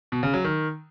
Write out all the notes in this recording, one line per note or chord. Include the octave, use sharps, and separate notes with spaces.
B2
C#3
F#3
D#3